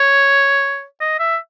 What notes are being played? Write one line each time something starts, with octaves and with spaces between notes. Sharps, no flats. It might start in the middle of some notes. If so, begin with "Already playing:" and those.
Already playing: C#5
D#5
E5